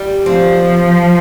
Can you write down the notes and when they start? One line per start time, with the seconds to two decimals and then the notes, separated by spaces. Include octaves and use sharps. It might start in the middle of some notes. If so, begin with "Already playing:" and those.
Already playing: G3
0.26 F3 C4